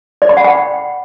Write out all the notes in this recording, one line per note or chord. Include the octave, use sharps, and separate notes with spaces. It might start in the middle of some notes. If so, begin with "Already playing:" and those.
D5
B5
F#5
G5